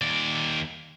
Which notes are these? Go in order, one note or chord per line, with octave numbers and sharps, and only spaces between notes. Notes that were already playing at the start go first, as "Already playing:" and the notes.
D#2 D5